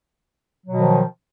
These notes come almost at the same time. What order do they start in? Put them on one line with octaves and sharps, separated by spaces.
F#3 B2 D#3 F3